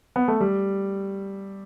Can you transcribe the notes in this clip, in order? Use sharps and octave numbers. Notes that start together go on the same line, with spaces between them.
B3
A3
G3